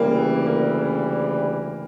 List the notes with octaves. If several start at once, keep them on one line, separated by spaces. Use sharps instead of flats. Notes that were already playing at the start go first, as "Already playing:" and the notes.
Already playing: D2 C#3 E3 G3 A#3
A#3